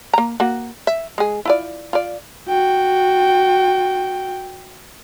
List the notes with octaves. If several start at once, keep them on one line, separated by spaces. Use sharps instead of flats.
A#3 A#5
A#3 F#4
E5
G#3 G#4
E4 F4 D5
F4 D5
F#4 G5